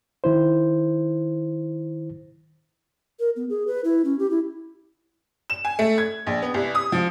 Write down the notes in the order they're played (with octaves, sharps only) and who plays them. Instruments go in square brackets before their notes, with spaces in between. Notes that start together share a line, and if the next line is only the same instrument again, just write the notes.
[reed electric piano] D#3 E4 C5
[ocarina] A#4
B3
G#4
B4
E4
C#4
G4
E4
[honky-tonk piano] E7
G#5
A3
G#6
A#1
B3
C2
D#6
F3